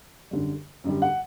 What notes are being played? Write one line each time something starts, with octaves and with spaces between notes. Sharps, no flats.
F#2 D3 G3
F#2 D3 G3
F#5